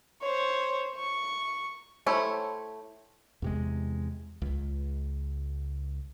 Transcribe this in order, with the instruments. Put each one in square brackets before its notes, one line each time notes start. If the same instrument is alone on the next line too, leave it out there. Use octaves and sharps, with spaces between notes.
[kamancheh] C5 C#5
C#6
[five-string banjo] A3 E4 G4 C5 C#5
[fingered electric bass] E2 C3 G#3
C#2